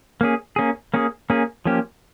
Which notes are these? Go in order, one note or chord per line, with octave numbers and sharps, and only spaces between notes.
A#3 C#4 G#4
A#3 C#4 G#4
A#3 C#4 G#4
A#3 C#4 G#4
F3 A#3 C#4 G4